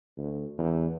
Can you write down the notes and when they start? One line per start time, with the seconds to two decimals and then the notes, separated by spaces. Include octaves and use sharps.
0.18 D2
0.58 E2